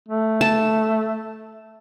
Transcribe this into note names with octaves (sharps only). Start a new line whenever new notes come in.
A3
A5